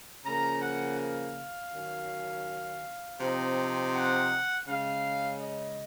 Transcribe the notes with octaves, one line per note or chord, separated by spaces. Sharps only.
C#3 F3 A#3 A#5
F#5
F5
D#3 F#3 C#4
C3 F3 C4 D#4
F#5
C#3 G#3 C#4 F5
D#5